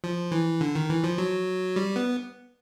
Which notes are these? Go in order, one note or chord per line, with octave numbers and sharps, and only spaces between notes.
F3
E3
D3
D#3
E3
F3
F#3
G3
B3